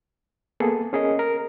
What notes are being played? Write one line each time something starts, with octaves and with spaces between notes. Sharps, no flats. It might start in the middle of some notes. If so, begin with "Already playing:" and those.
A#3 B3 G#4 A4
C#4 G#4 A#4 D#5
A#4